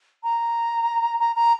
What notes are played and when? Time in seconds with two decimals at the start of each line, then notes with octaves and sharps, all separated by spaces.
0.23 A#5
1.20 A#5
1.36 A#5